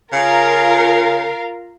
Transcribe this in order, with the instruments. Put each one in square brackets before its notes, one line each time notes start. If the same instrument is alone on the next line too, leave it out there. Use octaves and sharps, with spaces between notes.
[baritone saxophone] C#3 [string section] F4 A#4 F5